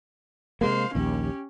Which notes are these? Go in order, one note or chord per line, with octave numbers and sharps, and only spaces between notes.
C3 G#3 A#3 C5 F5
A#1 D#2 C#4 G4